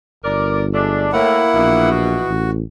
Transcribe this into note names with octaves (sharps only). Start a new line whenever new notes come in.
G1 A#4 D5
G#3 A3 D4
A2 A#3 E4 F#5
A#1 B2 E3
F#4
A1